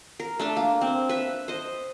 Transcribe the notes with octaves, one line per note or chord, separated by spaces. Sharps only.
A#4
A3 D4 A5
A#3
C4
B4 E5
C5 D#5